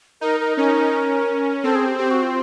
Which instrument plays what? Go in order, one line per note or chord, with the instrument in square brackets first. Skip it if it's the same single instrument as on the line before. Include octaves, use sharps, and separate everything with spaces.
[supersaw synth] D#4 [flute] A#4
[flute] A#4
[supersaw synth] C#4 [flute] A#4
[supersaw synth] C4 [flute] A4
[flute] G#4
G4
[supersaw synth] C4 [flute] G4
[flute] F#4
F4